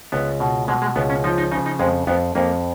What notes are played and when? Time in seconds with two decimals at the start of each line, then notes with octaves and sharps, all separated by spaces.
0.12 C#2 B3
0.40 B2
0.68 B2 G#3
0.82 G#3
0.96 C#2 B3
1.10 C#4
1.24 F3 D#4
1.38 D#4
1.51 C#3 D#4
1.66 D#4
1.79 F2 G#3
2.07 F2 B3
2.35 F2 A#3